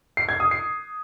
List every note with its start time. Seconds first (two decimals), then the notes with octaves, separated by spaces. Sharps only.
0.17 C7
0.29 G#6
0.40 D#6
0.51 C7